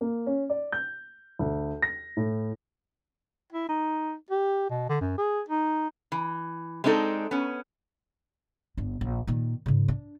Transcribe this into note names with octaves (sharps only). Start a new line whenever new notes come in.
A#3
C#4
D5
G6
D2
A#6
A2
E4
D#4
G4
B2
D3
F#2
G#4
D#4
E3
G#3 C4 D4 D#4 A4
B3 C#4
G1 D4
A#1
A#2 D#3
G#2 C#3
D4